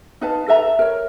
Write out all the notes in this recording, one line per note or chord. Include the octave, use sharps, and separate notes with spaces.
D#4 B4 F5 A5
A4 B4 E5 A#5
A#4 C#5